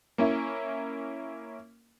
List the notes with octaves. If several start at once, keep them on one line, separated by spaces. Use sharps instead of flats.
A#3 C#4 E4